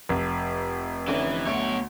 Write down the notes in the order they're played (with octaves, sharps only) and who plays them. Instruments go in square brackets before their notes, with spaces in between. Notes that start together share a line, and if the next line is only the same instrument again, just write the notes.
[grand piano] F1
[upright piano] D3 C4 C#4 [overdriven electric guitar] E3
[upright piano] D2 E5 D7 [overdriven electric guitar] B2 C#5